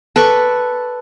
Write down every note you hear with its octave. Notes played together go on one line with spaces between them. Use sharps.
A4 B4 D5 C#6